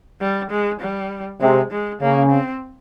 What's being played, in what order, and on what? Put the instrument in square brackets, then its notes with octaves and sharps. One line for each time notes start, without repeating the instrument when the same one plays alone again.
[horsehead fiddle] G3
G#3
G3
[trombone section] C3 [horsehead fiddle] G#3
[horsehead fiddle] G#3
[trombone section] C#3 [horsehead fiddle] A#3
[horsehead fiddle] C4